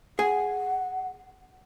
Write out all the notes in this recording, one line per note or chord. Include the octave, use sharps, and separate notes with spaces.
G#4 F#5 G#5